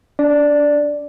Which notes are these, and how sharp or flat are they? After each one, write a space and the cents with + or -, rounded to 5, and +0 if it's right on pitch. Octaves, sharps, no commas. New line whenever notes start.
D4 -30 D5 +0